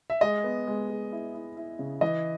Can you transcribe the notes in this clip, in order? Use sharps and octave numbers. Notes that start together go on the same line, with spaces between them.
E5
G#3 D#5
B3
G#3
G#3
E4
E4
E4
C#3
E3 D#5